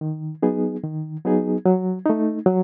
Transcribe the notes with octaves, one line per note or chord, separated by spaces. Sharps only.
D#3
F#3 B3 D#4 G#4
D#3
F#3 B3 D#4 G#4
F#3
A3 D#4
F#3